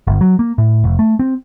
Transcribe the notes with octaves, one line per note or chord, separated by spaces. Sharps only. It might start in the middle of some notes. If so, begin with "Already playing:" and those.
G1
F#3
A#3
A2
F1
A3
C4